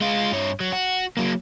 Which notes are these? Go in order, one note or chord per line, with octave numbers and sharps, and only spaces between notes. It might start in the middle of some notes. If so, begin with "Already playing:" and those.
G#3 F4
G2 C#5
F#3
F#4
F#3 A#3